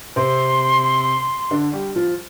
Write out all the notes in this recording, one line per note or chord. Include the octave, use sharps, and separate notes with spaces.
C3 C4 C6
D3 D4
G3 G4
F3 F4